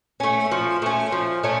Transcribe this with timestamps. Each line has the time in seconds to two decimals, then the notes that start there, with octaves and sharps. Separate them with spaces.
0.20 A3 C#4
0.51 F3
0.82 A3 C#4
1.12 F3
1.43 A3 C#4